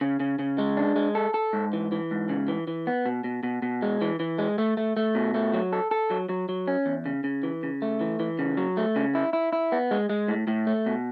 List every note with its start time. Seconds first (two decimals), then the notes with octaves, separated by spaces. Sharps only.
0.01 C#3
0.20 C#3
0.39 C#3
0.58 G#3
0.77 D4
0.96 G#3
1.15 A4
1.34 A4
1.53 G#2
1.73 E3
1.92 E3
2.11 G#2
2.29 C#3
2.48 E3
2.68 E3
2.87 B3
3.06 B2
3.24 B2
3.43 B2
3.62 B2
3.82 G#3
4.01 E3
4.20 E3
4.38 G#3
4.58 A3
4.77 A3
4.97 A3
5.15 B2
5.34 A3
5.53 F#3
5.73 A4
5.91 A4
6.10 F#3
6.29 F#3
6.49 F#3
6.68 C#4
6.86 E2
7.06 C#3
7.24 C#3
7.43 E3
7.63 C#3
7.82 A3
8.01 E3
8.20 E3
8.39 C#3
8.57 F#3
8.77 A3
8.96 C#3
9.15 E4
9.33 E4
9.53 E4
9.72 B3
9.91 G#3
10.10 G#3
10.28 A2
10.48 A2
10.67 A3
10.86 B2